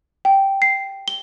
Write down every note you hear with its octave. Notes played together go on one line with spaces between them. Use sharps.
G5
C7
G7